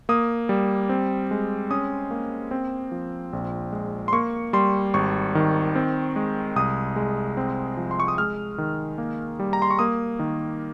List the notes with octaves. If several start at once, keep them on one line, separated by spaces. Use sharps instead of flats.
A#3 D#6
G3
C4
G#3
C#4 D#6
A#3
C4
F3
A#1
G#3
C6
A#3 C#6
G3 C6
G#1 C#6
D#3
C4
G#3
C2 D#6
G#3
C4
F3
C6
C#6
D#6
G#3 F6
D#3
A#3
G3
A#5
C6
C#6
A#3 D#6
D#3